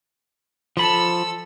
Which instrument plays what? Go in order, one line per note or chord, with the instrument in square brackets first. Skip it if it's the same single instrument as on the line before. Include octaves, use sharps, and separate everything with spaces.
[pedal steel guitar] F3 B5 [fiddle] A4 E6